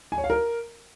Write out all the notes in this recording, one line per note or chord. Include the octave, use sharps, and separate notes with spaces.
G#5
C#5
F5
A#4